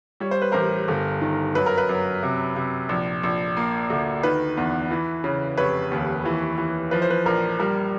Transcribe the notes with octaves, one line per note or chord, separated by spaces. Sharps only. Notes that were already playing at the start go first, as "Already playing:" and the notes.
G3 C#5
C5
B4
A1 A#4 C5
G1
D#3
F#2 B4
A#4
B4
F#2
C3
C3
A#1
A#1
A#3
D2
D#3 B4
E2
E3
C#3
F1 B4 C#5
D#2
E3
E3
F3 B4
C5
B4
A#1 A#4
G3 A#4